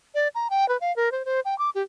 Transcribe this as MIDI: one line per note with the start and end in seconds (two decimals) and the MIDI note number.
0.15 0.28 74
0.35 0.48 82
0.50 0.68 79
0.69 0.77 71
0.81 0.94 77
0.96 1.12 70
1.12 1.25 72
1.25 1.40 72
1.45 1.57 79
1.58 1.70 86
1.75 1.82 67